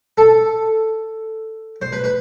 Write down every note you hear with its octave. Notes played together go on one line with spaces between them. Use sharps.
A4
C5
B4
B4